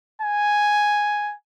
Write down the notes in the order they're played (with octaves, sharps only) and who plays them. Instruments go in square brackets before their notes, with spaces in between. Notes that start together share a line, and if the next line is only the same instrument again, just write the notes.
[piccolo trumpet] G#5